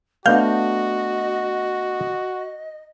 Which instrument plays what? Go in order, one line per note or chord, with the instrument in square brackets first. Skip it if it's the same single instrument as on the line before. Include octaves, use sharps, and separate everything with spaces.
[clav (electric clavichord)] A3 B3 D4 [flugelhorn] F#4 [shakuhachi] D#5 [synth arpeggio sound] F5 G6